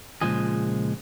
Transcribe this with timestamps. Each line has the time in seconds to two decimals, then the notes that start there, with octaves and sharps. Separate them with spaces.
0.21 C#2 G2 A#2 F3 G#3 G#4